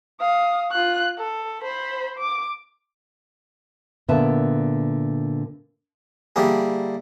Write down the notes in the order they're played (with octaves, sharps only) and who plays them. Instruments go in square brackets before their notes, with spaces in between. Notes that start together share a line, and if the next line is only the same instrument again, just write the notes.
[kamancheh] F5 D#6
F4 F#6
A4
C5 B5
D6
[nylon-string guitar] A#2 D3 B3 E5 A5
[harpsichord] D3 G3 A#3 E4 G#4